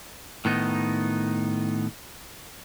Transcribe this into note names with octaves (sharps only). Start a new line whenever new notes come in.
A2 D#3 B3 D#4